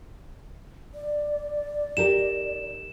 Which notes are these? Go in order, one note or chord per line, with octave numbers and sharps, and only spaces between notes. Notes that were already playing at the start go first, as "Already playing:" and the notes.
D5
D#4 G4 A#4 E7